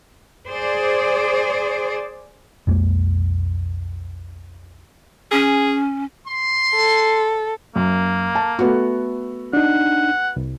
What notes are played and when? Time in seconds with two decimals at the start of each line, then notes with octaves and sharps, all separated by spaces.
0.47 G#4 C5 D5
2.67 B1 F2 G#3 A#3
5.32 C#4 G#4
6.27 C6
6.74 A4
7.76 F#2 A#3
8.35 A5
8.59 A3 B3 F#4
9.53 D4 D#4 F#5
10.36 C2